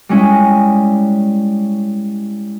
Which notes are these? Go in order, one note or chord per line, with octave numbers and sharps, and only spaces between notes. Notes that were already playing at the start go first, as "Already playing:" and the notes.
G3 G#3 C#4 E4